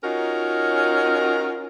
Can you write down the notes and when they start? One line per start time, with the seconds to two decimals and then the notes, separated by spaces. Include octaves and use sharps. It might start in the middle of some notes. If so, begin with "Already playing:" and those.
0.03 C#4 D#4 F4 F#4 A#4